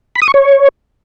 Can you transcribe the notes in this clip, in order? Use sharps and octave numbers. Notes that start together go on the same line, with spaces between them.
B5
D#6
C#6
C#5